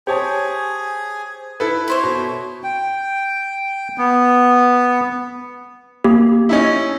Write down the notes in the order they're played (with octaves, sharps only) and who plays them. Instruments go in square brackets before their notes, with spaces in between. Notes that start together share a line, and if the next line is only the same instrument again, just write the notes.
[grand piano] G4 C#5 A5 [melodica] G#4 G#5 [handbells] C5
[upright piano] E4 A4 B4
[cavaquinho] E4 C5 C#5
[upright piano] B2
[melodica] G5
B3
[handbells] A#3 G4
[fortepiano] C#4 D#4 E4